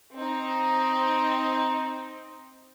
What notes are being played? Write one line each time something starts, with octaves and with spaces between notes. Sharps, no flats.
C4 D#4